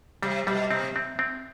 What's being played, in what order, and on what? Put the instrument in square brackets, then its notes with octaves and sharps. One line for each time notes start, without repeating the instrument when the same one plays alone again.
[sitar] C3 [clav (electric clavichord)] G3
[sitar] B2 [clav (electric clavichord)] G3
[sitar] C3 [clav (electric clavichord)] C4
[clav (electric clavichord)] C4
C4